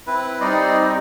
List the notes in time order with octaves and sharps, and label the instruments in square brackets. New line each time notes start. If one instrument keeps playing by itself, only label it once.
[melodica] C4 E4 B4
[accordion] G3 C4 D#4 [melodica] C5 D5 D#5